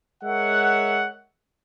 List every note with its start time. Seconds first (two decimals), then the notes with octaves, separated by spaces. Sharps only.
0.24 G#3 A#4 C#5 E5 F#5